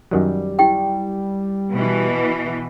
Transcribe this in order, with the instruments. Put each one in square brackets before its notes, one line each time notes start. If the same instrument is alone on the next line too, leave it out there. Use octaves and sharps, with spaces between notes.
[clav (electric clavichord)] F#2 D#3 F#3 [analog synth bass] G3
[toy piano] E4 G4 G5
[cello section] B2 E3